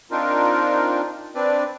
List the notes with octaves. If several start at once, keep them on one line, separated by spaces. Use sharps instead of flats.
C4 D4 D#4 F4 A#4
C4 D4 B4 D5